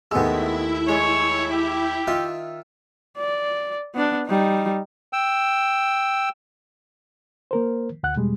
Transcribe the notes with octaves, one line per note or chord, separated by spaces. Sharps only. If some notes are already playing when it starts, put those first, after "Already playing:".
D#2 G#3 A3 B3 E4 E5 E6
G#3 C#5
G4
D#3 F4 E5
D5
B3 D4
G3 D#4
G5 E6
A#3 A#4 C5
D2 F#5 F#6
E2 B2 G3 G#3